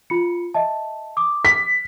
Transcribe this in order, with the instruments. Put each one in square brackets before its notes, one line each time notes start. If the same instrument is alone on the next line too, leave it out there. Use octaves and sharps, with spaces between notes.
[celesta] F4 B5 C#7
D#5 E5 A5
D6 D#6
[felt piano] B6